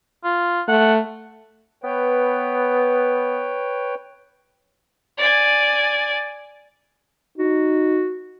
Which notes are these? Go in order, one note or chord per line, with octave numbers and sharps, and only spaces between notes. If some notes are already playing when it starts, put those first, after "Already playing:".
F4
A3 F#5
B3 B4 C#5 G5
D5 G#5
D#4 F#4